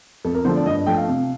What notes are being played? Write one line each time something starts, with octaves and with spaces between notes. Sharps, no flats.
F2 A4
A#4
D3 F3 A3 C5
D5
G2 D#5
F3 A3 G5
F5
C3